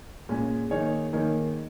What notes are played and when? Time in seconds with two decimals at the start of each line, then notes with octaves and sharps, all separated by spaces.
0.29 A#2 G#3 C#4 G#4
0.71 D#3 A#3 D#4 G#4 C#5
1.13 D#3 A#3 D#4 G#4 C#5